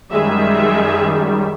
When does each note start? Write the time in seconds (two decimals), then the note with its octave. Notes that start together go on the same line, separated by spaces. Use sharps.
0.11 F#2 D#3 G3 G#3 G#4 E5